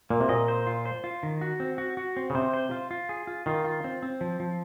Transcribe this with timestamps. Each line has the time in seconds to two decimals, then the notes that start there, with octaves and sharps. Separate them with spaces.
0.10 A#2 A#3
0.21 C3
0.29 A#2 D#5
0.48 C5
0.67 F4
0.85 C5
1.04 F4
1.23 D#3
1.41 F#4
1.60 C4
1.78 F#4
1.97 F#4
2.17 C4
2.30 C#3
2.35 C3 C5
2.54 C5
2.71 F4
2.91 F4
3.09 G#4
3.27 F4
3.46 D#3 F4
3.64 F4
3.84 C4
4.03 C4
4.21 F3
4.40 F3